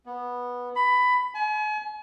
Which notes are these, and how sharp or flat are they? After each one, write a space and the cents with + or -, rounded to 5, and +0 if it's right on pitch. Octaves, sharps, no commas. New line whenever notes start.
B3 -10
B5 +15
G#5 +40